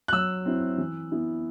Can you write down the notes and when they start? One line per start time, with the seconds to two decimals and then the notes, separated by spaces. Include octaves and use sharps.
0.08 F#6
0.13 F#3 E6
0.45 C4 E4
0.78 E3
1.12 B3 E4